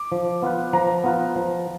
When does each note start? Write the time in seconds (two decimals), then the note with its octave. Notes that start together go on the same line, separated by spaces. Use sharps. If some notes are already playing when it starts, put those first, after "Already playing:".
Already playing: D6
0.12 F3
0.42 B3 F4 B4
0.73 F3 A#5
1.04 B3 F4 B4
1.36 F3